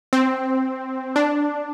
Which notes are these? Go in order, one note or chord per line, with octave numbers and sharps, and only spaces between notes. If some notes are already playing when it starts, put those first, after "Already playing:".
C4
D4